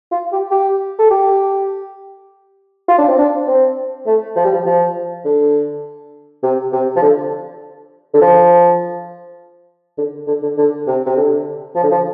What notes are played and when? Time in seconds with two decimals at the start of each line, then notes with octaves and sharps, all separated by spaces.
0.12 F4
0.32 G4
0.51 G4
0.99 A4
1.11 G4
2.88 F4
2.98 D4
3.08 C4
3.19 D4
3.48 C4
4.06 A3
4.36 F3
4.45 G3
4.54 F3
4.66 F3
5.25 D3
6.43 C3
6.73 C3
6.96 F3
7.02 D3
8.14 D3
8.21 F3
9.98 D3
10.27 D3
10.43 D3
10.58 D3
10.87 C3
11.06 C3
11.17 D3
11.75 F3
11.83 D3
11.91 F3